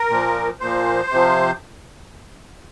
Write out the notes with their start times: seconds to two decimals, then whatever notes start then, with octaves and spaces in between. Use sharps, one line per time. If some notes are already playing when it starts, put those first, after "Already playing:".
Already playing: A#4
0.10 A#2 F3
0.60 A#2 F3 C5
1.11 C3 F3